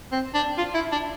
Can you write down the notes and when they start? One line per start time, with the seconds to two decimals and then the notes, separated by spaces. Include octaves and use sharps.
0.12 C4
0.35 D4
0.58 F4
0.75 E4
0.92 D4